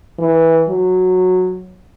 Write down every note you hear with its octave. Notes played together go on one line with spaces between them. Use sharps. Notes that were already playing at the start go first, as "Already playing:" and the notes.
E3
F#3